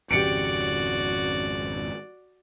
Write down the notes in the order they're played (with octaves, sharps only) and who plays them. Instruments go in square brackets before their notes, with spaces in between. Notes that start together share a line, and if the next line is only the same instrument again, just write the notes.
[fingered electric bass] G#1 F2 C#3 [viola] F#4 D5 [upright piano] G4 C#7 D7